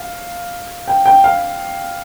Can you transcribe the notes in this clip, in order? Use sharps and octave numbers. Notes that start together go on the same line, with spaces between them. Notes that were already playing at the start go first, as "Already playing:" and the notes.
Already playing: F5
G5
G5
F5